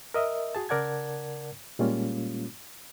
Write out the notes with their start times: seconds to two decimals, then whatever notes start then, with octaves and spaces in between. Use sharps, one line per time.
0.14 A#4 D#5 E5
0.55 F#4 G#4 A5
0.69 C#3 A#4 D5 F#5 A5 G#6
1.79 A#2 G3 G#3 A#3 C#4 F4